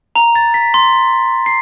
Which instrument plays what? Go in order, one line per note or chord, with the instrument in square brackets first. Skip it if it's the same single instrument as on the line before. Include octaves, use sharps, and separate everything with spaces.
[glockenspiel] A#5
A6
B6
C6
C7